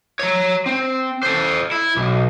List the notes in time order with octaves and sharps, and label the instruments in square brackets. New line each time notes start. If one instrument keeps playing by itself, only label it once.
[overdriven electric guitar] C#5 A#5
C4
A4 C5
E4
B1